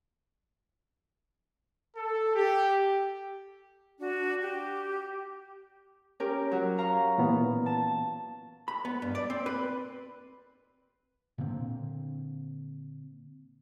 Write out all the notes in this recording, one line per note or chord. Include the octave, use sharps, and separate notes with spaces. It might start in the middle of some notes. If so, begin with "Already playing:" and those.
A4
G4
D4 F#4
G4
C#4 G4 A#4
F#3 F#4
F5 A#5 C#6
A#2 E3 B3
A5
B5
B3
G2
D5
C4
B4
A#2 D3 A#3 C4